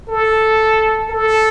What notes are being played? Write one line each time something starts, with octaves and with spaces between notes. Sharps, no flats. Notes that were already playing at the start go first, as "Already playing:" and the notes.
A4
A4